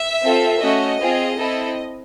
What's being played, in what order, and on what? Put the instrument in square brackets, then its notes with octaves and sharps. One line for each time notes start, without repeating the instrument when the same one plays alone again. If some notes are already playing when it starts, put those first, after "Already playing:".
Already playing: [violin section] E5
C4 F4 A4
A3 C#4 F#4 D#5
C4 F4 G#4
C4 E4 A4